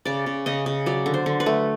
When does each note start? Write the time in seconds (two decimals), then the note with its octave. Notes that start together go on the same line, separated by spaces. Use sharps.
0.05 C#3 D5
0.26 C#3
0.46 C#3 D#5
0.66 C#3
0.86 F#3 D5
1.06 D3
1.14 C5
1.26 D3
1.40 B4
1.46 A3